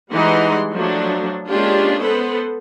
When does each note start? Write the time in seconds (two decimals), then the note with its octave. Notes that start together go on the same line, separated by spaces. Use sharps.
0.12 E3 G3 G#3 D#4 F#5 C6
0.73 F3 F#3 A3 D4
1.48 G#3 A#3 C#4 D4 F4 G4
2.01 B3 A4 B4 C5